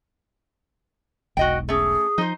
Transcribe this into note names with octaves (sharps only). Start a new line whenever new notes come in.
E1 B1 F#4 D#5 G5
A3 C#4 G#4
F3 D#4 C5